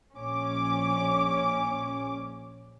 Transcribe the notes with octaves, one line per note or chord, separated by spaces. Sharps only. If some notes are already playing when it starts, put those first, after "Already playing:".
A#1 C#4 D6